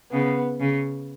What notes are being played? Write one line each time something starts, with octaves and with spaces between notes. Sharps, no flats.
C#3 B3
C#3